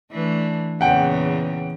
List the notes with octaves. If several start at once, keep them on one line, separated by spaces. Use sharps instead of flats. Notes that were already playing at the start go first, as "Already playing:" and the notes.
E3 A3 D4
E2 A#2 C#3 F#5 G5